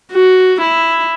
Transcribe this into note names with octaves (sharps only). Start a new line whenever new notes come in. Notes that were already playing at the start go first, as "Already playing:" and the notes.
F#4
E4